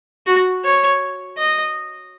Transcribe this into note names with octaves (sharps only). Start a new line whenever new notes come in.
F#4
C#5
D#5